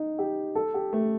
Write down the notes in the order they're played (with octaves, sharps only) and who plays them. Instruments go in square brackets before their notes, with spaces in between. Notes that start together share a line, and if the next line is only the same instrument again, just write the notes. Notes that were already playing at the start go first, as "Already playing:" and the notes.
Already playing: [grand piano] D#4
G4
A4
G4
A3